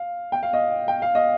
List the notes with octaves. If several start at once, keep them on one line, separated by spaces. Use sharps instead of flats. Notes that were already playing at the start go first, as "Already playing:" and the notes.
Already playing: F5
G5
F5
D#5
G5
F5
D#5